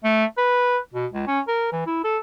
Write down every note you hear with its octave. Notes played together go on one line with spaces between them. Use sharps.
A3
B4
B2
C#2
C#4
A#4
E3
E4
A4